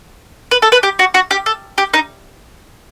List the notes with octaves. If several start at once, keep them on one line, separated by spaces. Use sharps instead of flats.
B4
A4
B4
G4
F#4
F#4
G4
A4
G4
D#4